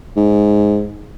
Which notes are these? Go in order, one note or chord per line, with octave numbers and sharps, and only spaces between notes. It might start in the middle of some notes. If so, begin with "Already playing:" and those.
G#2